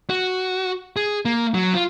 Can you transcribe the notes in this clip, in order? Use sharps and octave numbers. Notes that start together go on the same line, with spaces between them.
F#4
G#4
A#3
F#3
F4